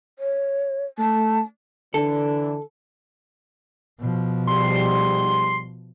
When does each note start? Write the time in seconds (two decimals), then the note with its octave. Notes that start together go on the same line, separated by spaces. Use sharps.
0.19 C#5
0.98 A3 A5
1.94 D3 E3 D4 A4
4.00 B2 F3
4.47 G#2 G3 C6